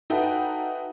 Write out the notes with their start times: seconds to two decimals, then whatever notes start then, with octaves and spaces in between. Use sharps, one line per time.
0.10 D#4 F#4 A4 B4 E5 G5